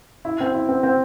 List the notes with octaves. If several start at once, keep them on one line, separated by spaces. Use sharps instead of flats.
E4
C4
E4
C4
C4